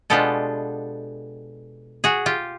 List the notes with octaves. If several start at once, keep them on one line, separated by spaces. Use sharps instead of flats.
B2 G#3 B3 D4 F4 G4 A4
F#4 G#4
F4 G4